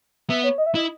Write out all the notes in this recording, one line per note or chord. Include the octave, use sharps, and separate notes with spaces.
B3 E5
C#5
D#5
E5
E4 D#5